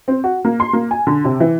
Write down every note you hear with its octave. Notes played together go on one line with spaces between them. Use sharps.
C4
F#4
A#3
C6
A#3
G#5
D3
C3
E3